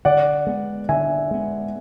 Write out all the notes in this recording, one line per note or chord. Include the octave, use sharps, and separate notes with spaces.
D3 D5 F#5
G#3 B3
D3 E5 G#5
G#3 B3